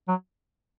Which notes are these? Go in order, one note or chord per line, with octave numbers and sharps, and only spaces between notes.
F#3